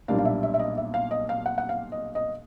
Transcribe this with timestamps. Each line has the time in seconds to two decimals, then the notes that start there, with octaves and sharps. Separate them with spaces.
0.08 B1 A#2 G3 A#3 D4 F5
0.19 F5
0.25 E5
0.43 E5
0.54 E5
0.59 D#5
0.78 E5
0.94 F5
1.11 D#5
1.29 F5
1.46 F#5
1.58 F#5
1.69 F5
1.92 D#5
2.15 D#5